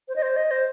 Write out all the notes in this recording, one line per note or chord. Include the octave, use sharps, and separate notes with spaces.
C5
D#5
C5
D#5
C5